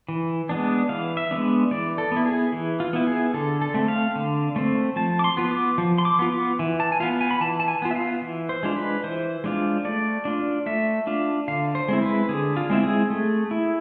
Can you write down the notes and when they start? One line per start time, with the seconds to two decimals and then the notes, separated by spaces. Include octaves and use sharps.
0.08 E3
0.49 G#3 B3 D4
0.89 E3 F5
1.17 E5
1.31 G#3 B3 D4
1.71 E3 D5
1.98 A4
2.12 B3
2.17 E4
2.26 G#4
2.52 E3
2.80 F4
2.93 B3 E4
3.07 G#4
3.34 D3 A4
3.62 A4
3.74 A3 C4
3.88 F5
4.16 D3
4.56 A3 C4
4.96 F3 A5
5.19 D6
5.24 C6
5.37 B3 F4
5.51 D6
5.78 F3
5.98 C6
6.05 D6
6.19 B3 F4
6.32 D6
6.59 E3
6.80 A5
6.92 G#5
7.00 B3 F4 F5
7.21 G#5
7.31 B5
7.41 E3 A5
7.60 A5
7.68 G#5
7.82 B3 F4
7.91 E5
7.95 F5
8.22 E3
8.49 C5
8.63 G#3 D4 F4
8.76 B4
9.04 E3 C5
9.44 G#3 D4 F4
9.85 A3 D5
10.25 D4 F4
10.66 A3 E5
11.07 D4 F4
11.48 D3 F5
11.75 C5
11.88 G#3 C4 E4
12.02 B4
12.29 D3 G#4
12.57 F4
12.70 G#3 C4 E4
12.83 G#4
13.10 A3
13.51 E4